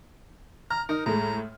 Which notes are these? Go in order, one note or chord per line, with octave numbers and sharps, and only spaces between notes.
A#5 F6
D#4 A#4
A2 G#3 A3 A#5